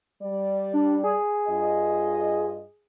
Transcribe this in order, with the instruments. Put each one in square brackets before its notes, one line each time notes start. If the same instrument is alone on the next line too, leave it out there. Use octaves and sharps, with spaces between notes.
[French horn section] G3 D5
[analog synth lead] D4
G#4
[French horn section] G2 F4 D#5